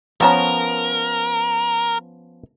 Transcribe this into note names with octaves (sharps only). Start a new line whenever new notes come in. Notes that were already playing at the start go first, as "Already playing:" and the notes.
F3 B3 C#4 A#4 C#5 A5 A#5